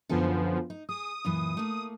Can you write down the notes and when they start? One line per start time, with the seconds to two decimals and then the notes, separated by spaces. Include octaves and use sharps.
0.09 F#2 D3 F3 B3 A4 G#5
0.70 D#4
0.89 G#4 D#6
1.25 F#2 A#2 E3
1.57 A3 A#3